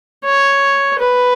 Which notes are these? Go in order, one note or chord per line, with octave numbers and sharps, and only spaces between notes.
C#5
B4